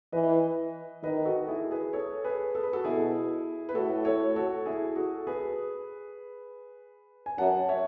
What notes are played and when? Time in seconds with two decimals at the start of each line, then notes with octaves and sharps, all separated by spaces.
0.12 E3 B4 D#5
1.03 D#3 B4 D#5
1.25 F#4 A4
1.48 E4 G#4
1.71 G#4 B4
1.93 A4 C#5
2.24 G#4 B4
2.55 A4
2.63 B4
2.73 F#4 A4
2.85 B2 E4 G#4
3.69 B4
3.75 A2 F#4 A4
4.05 A4 C#5
4.36 F#4 A4
4.66 E4 G#4
4.96 F#4 A4
5.27 G#4 B4
7.26 G#5
7.38 F#2 F#5 A5
7.68 C#5 E5